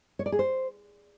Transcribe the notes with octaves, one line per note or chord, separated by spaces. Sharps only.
C#5
D5
G#4
C5